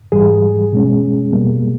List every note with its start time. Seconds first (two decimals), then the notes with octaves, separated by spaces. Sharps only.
0.12 G#2 E3 G3 G#4
0.73 B2 G#3 C#4
1.33 B2 G3 A#3